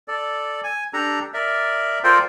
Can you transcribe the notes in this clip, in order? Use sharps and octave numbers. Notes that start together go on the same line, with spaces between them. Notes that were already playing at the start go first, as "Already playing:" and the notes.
A4 D5
G#5
D4 G4 A4 A#5
A#4 D5 E5
F4 A4 A#4 C5 D5 G5